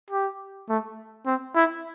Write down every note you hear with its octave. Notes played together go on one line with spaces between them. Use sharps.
G4
A3
C4
E4